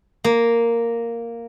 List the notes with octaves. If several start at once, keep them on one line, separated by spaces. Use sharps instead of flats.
A#3